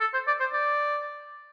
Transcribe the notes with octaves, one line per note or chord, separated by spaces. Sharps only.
A4
C5
D5
C5
D5